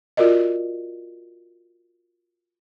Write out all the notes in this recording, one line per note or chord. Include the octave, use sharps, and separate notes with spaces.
F4 F#4 A#4 D5 D#5